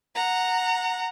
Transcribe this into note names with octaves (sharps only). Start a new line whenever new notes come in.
F#5 A#5